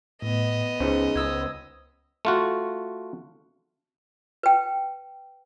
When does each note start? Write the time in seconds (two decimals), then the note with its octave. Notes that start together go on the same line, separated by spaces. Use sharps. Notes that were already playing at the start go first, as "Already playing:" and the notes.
0.22 A2 B3 D#5
0.80 C#2 C#4 D#4 G#4 C5
1.16 C#2 D#6 E6 G#6
2.25 A3 F4 F#4
4.43 B4 G5